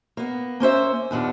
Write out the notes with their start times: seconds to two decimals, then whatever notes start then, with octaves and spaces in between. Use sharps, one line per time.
0.17 A#3 B3
0.60 A#3 C#4 C5 E5
1.11 D#2 A#2 B3 D4